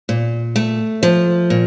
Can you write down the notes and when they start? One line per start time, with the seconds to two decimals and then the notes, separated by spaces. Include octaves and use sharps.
0.09 A#2
0.56 A3
1.03 F3
1.50 A#2